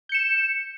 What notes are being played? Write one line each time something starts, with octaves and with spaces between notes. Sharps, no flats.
G6 C#7 E7